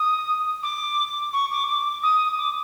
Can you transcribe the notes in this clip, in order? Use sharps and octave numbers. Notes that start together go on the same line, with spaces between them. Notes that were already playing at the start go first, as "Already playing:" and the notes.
Already playing: D#6
D6
C#6
D6
D6
D#6
D6